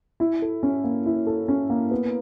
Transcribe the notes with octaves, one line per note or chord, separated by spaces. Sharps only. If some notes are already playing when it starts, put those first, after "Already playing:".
E4
A4
C#4
A#3
E4
A4
C#4
A#3
B3